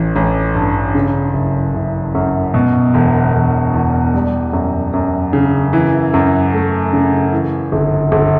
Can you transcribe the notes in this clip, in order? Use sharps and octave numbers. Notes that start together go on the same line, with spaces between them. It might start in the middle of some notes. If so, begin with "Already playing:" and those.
Already playing: A1 E3
A1
G2
C#3
F#1
F#1
F#2
B2
E1
E1
E2
G3
F#2
F#2
C#3
E3
F#2
A3
C#3
E3
G1
G1